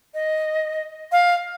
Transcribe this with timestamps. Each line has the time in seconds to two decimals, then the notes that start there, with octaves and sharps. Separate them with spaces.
0.14 D#5
1.12 F5